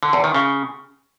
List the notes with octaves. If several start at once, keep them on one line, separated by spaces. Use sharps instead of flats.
D3
E2
D#3
C#3